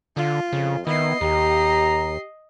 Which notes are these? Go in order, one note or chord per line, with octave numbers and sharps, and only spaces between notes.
D3 F4
F2 C#3
D#3 B3 E4 D#5 C7
D#2 G4 A#5